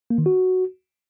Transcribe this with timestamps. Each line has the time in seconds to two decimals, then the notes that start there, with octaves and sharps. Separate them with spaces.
0.10 A#3
0.18 D#3
0.26 F#4